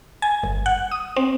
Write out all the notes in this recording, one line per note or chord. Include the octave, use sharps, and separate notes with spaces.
G#5
G1
F#5
D#6
C4